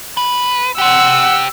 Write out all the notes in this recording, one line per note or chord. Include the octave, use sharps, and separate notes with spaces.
B4
G4 C5 F#5 E6